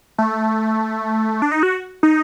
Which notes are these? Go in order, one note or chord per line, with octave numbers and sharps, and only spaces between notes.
A3
D4
D#4
F#4
D#4